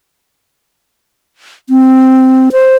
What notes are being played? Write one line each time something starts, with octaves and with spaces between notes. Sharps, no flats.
C4
C5